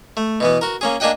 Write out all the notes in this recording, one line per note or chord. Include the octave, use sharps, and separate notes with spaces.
A3
B2 E3 B3
F#4 A#4
A#3 C#4 G#4
A#3 D4 G#4 D#5 F#5 G5